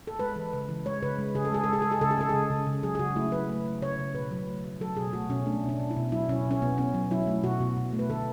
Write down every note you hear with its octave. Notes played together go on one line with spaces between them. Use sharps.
A4
G#3 B4
E3
C#3 B4
E3
G#3 C#5
C#3 B4
G#3
C#3 G#4
A4
G#3 G#4
A4
G#3 G#4
G#3 A4
G#4
C#3 A4
G#4
G#3 A4
C#3 G#4
C#3
C#3
F#3 G#4
G#4
C#3 F#4
A3 E4
F#3 B4
A3
A3
C#3 C#5
C#3
B2 B4
F#3
A3
F#3
F#3 A4
B2 G#4
A3 F#4
B2 C#4
A3 D4
B2
D4
B2
E4
B2
F#3 E4
B2 C#4
B2
C#4
B2 B3
B2 C#4
F#3
F#3 E4
A3
B2 F#4
B2
B2
A3
B4
D3 A4